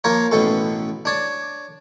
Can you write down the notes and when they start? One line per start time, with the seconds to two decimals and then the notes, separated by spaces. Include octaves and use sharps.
0.04 F3 A#3 A#4 C#5
0.31 A1 B2 C#4 A4 C#6
1.05 D4 C#5 D5